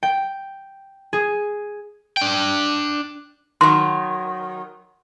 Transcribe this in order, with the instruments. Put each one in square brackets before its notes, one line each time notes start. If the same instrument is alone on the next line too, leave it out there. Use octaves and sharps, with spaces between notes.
[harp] G5
G#4
[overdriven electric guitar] D4 G5
[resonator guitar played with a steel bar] D#3 F#3 [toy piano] C6